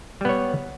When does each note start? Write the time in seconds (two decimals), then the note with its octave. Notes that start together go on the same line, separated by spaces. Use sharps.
0.21 G3
0.25 B3
0.29 C#5